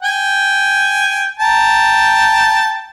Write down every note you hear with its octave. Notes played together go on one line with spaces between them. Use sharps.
G5 G#5
G5 A5 A#5